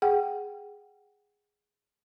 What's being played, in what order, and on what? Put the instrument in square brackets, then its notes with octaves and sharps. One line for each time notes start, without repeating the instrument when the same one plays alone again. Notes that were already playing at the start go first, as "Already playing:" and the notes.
[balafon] G#4 F#5 G5